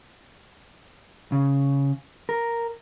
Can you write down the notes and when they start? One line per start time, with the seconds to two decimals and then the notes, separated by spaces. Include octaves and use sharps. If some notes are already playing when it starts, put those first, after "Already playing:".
1.32 C#3
2.29 A#4